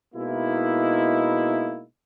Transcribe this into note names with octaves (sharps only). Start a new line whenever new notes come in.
B2 G#3 A#3 D#4 E4